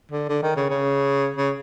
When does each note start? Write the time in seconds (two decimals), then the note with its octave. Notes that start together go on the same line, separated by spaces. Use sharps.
0.11 D3
0.29 D3
0.42 D#3
0.56 C#3
0.70 C#3
1.37 C#3